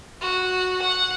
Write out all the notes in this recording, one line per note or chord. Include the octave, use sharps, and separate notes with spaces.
F#4
F#5